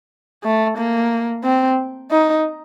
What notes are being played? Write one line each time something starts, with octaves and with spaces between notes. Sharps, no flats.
A3
A#3
C4
D#4